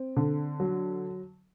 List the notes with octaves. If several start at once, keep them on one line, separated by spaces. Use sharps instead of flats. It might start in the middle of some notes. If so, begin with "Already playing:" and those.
Already playing: C4
D3
F#3